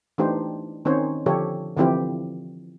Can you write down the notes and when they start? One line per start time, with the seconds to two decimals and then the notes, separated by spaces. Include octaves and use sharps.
0.18 E3 A3 D4 D#4 G4 C5
0.85 D#3 C4 C#4 D#4 C5 C#5
1.26 D3 F3 G4 A4 C#5
1.77 D3 E3 F3 C4 E4 G4